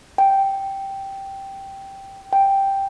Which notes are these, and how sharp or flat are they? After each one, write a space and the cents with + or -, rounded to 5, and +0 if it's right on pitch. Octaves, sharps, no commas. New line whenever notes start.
G5 -5
G5 +0